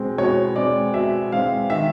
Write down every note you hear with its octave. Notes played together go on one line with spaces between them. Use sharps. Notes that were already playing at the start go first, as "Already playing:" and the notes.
Already playing: B2 G#3 C4
B2 C#5
G#3 C4 D5
B2 E5
G#3 C4 F5
D#3 E5